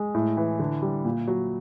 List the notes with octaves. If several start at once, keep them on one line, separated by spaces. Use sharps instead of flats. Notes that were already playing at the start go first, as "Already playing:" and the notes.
Already playing: G#3
A2
E3
D3
G3
A#2
F#3